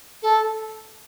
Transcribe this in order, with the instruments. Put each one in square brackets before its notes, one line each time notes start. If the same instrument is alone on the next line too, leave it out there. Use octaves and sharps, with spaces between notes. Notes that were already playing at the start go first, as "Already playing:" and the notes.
[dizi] A4